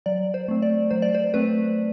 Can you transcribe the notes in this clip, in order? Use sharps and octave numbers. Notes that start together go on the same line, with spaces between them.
F#3 D5
C5
A3 C4
D5
F#3 C5
D5
C5
A3 C4 B4